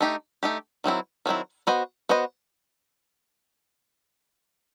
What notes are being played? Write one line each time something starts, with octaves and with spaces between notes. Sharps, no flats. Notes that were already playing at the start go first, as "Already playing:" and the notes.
A3 D#4 G4
A3 D#4 G4
D#3 F#3 C4 E4
D#3 F#3 C4 E4
B3 F#4 C5 D#5
B3 F#4 C5 D#5